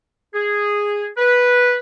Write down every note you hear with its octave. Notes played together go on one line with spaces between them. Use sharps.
G#4
B4